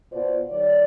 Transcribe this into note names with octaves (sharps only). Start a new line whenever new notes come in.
B2 B3 F4 C5 D5
D#3 G3 C#5 D5